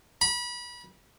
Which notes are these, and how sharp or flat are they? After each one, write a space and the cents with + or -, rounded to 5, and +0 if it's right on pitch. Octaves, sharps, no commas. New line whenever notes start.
B5 -30